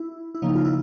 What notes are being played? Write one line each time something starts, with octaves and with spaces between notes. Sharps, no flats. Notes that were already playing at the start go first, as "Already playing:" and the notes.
Already playing: E4
E4
C#3 F3 A#3 D#4
F4
E4